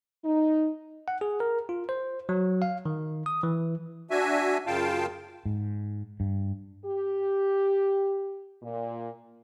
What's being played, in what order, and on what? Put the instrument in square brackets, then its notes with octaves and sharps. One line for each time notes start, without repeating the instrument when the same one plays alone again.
[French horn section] D#4
[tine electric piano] F#5
G#4
A#4
F4
C5
F#3
F5
D#3
D#6
E3
[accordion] D4 F#4 E5 G#5
F#2 C#3 F4 F5 G5 A5
[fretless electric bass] G#2
G2
[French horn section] G4
A#2